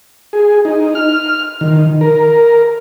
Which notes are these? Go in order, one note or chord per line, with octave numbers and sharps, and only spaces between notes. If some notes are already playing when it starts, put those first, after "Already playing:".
G#4
D#4
F6
D#3
A#4